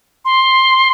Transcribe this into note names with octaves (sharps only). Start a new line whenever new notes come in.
C6